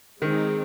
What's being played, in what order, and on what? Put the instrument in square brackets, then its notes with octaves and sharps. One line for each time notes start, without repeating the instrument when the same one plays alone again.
[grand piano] D#3 [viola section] G#3 C4 D#4 G#4